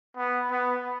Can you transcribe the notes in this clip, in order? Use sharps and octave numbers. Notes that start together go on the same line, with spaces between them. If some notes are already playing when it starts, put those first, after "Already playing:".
B3
B3